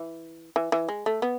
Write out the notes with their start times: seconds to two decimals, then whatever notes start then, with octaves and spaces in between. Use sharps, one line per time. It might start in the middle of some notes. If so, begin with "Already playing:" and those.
Already playing: E3
0.56 E3
0.72 E3
0.88 G#3
1.06 A3
1.22 B3